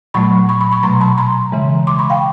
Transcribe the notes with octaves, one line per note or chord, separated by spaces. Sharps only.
A#2 F#3 A3 B5 C#6
B5 C#6
B5 C#6
B5 C#6
B2 F#3 A3 A#5 C6
A5 B5
A#5 C6
C#3 E3 G#3
C6 D6
B5 C#6
F5 G5